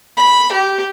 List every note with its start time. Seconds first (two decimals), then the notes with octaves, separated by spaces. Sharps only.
0.17 B5
0.52 G4